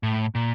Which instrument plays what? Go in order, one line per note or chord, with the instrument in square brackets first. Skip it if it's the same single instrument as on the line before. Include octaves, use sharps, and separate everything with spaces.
[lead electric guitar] A2
A#2